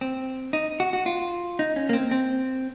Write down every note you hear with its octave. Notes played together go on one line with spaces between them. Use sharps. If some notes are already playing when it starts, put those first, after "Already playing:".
C4
D#4
F#4
F#4
F4
D#4
C#4
A#3
C4
C4